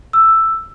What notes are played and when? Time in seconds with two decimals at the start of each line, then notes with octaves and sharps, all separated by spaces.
0.13 E6